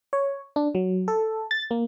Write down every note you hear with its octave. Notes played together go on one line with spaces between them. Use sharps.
C#5
D4
F#3
A4
A6
A#3